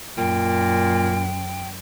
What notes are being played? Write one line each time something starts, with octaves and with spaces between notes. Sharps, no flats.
F#2 A#2 G5